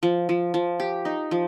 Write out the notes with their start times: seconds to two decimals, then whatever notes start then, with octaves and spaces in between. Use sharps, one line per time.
0.03 F3
0.29 F3
0.54 F3
0.80 G4
1.05 D#4
1.31 F3